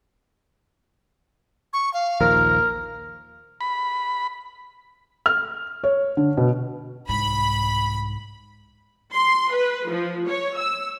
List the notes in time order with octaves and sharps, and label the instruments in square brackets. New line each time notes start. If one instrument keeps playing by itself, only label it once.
[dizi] C#6
F5
[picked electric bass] A#1 D#2 F3 [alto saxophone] A#4
[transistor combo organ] B5
[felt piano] F6
C#5
D3
B2
[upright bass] C2 G#2 [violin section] B5
[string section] C6
B4
F3
C#5
E6